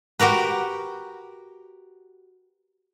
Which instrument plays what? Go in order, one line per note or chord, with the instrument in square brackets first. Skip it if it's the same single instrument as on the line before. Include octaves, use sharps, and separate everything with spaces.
[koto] F#4 G4 A#4 B4